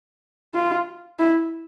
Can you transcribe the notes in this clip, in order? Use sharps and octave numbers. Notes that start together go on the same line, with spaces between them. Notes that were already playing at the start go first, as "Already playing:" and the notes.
F4
E4